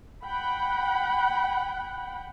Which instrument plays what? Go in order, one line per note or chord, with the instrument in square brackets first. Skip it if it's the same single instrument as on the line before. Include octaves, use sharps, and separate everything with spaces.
[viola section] F#5 G5 B5